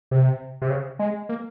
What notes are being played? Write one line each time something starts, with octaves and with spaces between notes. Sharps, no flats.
C3
C3
C#3
G#3
A#3